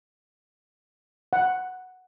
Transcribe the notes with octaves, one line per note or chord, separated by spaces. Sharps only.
F#5